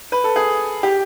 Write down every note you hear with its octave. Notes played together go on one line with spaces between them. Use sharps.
B4
A4
G#4
G4